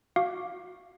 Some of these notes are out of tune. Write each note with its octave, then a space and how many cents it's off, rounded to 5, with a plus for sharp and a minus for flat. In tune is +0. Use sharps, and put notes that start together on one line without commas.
F#4 -20 F5 +0 D6 +0